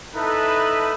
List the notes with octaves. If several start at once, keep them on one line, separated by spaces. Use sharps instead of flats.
D#4 E4 A4 B4